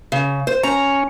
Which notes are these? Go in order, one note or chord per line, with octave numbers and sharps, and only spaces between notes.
C#3
C5
C#4 A#5